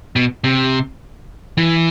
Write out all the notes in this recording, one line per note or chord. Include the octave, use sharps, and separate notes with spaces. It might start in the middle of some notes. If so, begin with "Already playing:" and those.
B2
C3
E3